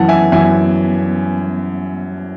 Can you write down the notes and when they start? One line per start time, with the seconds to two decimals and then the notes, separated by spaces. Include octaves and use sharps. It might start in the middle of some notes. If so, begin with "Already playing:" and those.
Already playing: F#2 E3 F#5 A5
0.08 E5 G#5
0.32 F#2 E3 E5 G#5